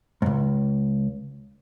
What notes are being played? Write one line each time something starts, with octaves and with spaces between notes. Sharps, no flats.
C#2 G#2